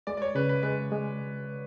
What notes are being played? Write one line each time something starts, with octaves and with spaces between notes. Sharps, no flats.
G#3 D5
D5
C#5
C#3 B4
B4
G#3 B4
G#3